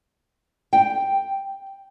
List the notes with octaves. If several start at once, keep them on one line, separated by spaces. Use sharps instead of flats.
G5